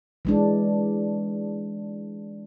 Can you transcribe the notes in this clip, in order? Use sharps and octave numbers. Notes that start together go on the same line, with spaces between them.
E3 G#3 D4